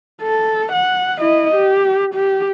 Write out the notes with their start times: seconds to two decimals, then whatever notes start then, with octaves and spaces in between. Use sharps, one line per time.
0.22 A4
0.72 F#5
1.20 E4 D#5
1.55 G4
2.15 G4